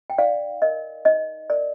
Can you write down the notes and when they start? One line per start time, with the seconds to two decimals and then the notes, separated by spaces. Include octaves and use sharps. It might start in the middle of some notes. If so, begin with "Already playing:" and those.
0.10 G5
0.18 D#4 D5 F5
0.62 A#4 D#5
1.05 D#4 D#5
1.50 A#4 D5